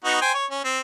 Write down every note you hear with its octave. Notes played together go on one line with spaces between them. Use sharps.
B3 D#4 F#4
C5 G5 G#5
C#5
C#4
C4